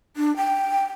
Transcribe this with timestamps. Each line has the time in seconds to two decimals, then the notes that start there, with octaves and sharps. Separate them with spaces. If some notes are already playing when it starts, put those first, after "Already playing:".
0.16 D4
0.37 G5